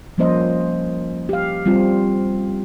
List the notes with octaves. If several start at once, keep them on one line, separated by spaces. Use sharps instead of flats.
F3 G3 A#3 C#4 C5 D#5
G4 F5
G3 C4 F4